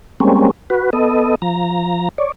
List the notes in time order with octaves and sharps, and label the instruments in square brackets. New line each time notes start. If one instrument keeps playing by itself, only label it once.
[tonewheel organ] G3 G#3 A#3 C4 C#4
F#4 B4
B3 A4 D#5
F3 A#5
C#5 D5